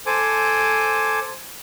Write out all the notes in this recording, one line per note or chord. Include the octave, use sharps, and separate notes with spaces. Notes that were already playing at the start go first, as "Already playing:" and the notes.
A4 C5 G#5 D6